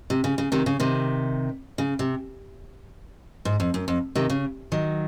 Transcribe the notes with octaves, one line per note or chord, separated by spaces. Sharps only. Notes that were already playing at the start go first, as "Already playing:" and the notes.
C3
C#3
C#3
C3 D#3
C#3
C3 D#3
C#3
C3
G#2
F2
F#2
F2
C3 D#3
C#3
D#3 F#3